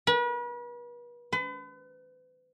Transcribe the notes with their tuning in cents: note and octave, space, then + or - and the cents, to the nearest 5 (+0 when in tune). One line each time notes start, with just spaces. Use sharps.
B4 -40
B4 +40